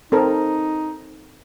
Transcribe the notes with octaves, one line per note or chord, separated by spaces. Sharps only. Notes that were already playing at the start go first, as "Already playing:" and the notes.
C4 D#4 A4 A#4